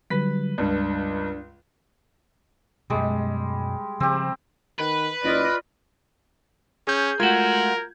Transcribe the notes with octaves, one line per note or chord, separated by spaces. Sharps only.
D3 F#3 G3 B4 B6
C#2 G2 D4 D5
F#2 B2 G3 G#3
C#3 F3 C4 G4
D#3 B4
F#1 F4 D5 D#5
C#4 G#4 G6
G#3 A3 F4 F#4 A#4 G#6